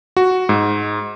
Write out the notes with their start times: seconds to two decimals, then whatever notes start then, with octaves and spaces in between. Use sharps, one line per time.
0.17 F#4
0.49 G#2